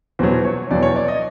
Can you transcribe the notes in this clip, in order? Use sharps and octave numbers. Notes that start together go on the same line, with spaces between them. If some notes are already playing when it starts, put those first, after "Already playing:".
E2 B2 F#3 C5
C#5
E2 B2 F#3 D5
C#5
D5
D#5